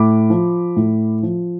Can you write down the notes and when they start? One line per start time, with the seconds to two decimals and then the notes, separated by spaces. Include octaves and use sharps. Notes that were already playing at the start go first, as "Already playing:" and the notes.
Already playing: A2 B5 D6
0.30 F3
0.76 A2
1.23 F3